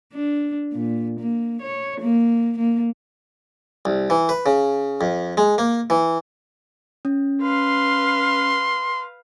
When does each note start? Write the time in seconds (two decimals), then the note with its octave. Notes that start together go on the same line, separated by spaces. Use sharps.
0.14 D4
0.72 A#2
1.20 A#3
1.62 C#5
2.00 A#3
2.59 A#3
3.85 C2
4.10 E3
4.29 B4
4.46 C#3
5.01 F2
5.37 G#3
5.58 A#3
5.90 E3
7.05 C#4
7.42 B4 F5 C6